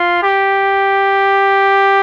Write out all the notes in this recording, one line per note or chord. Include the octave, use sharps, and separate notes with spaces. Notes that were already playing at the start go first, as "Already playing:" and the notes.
Already playing: F4
G4